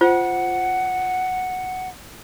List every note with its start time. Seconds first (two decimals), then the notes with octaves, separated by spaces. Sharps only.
0.01 F4 C5 F#5